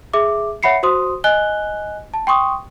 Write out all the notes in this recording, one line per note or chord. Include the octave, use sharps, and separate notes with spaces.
G#4 E5 D6
C#5 E5 F#5 B5 C7 C#7
F#4 C5 C6 D#6
D#5 G#5 F#6 G7
A5
G5 C6 C#6 D#6